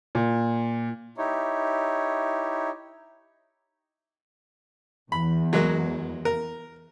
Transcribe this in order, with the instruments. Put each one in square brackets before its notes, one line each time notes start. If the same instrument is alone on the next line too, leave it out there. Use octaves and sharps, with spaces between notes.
[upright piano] A#2
[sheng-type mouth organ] D#4 E4 G4 C#5
[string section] E2 [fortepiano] B5
[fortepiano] F#3 G#3 A#3
A#4